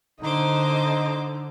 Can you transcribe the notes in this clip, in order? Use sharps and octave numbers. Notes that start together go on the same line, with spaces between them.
D3 D#4 C5 D#5 D6